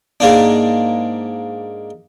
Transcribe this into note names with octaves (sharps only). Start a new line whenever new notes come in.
G#2 A#3 D4